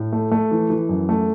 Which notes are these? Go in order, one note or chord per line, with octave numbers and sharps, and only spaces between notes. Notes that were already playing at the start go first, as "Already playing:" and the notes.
Already playing: A2
A3
A3
E3
E3
F#2
A3